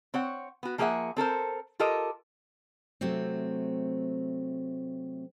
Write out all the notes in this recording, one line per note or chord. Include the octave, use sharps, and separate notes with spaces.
C4 C#5 F#5
B3 F#4
F3 A#3 G#4 A4 E5 F#5
C4 A4 A#4 C5
F4 G4 A4 A#4 D#5
C3 F#3 A3 C4